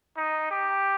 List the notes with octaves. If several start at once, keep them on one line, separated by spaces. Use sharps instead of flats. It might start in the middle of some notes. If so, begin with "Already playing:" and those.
D#4
G4